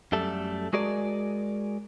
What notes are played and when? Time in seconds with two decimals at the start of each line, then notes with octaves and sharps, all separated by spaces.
0.12 F#2 G3 A3 A4
0.73 G#3 F#4 G#4 A#4 D5